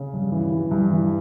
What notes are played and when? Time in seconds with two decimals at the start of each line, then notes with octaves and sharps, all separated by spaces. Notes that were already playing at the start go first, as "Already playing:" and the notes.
Already playing: C#3
0.14 G2
0.32 E3
0.52 E3
0.71 G2
0.91 E3